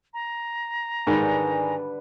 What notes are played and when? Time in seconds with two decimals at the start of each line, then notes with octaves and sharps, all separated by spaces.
0.14 A#5
1.07 G#2 D3 D#3 G3 B4 G#5